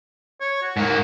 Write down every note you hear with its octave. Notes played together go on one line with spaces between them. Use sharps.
C#5
F#4
G#2 A#3